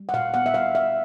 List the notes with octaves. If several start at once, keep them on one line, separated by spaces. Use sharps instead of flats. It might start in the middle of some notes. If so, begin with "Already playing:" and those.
Already playing: G3
F#5
A#2 F5
B3 F#5
E5
G3 F5
A#2 E5